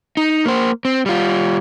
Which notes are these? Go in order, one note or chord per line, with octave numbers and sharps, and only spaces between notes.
D#4
A#3 C5
C4
G3 F4